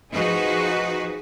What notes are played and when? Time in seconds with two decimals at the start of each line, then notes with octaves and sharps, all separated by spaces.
0.13 F3 D#4 F#4 G#4 B4